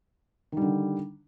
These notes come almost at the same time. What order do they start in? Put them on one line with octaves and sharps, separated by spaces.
D#3 G3 D3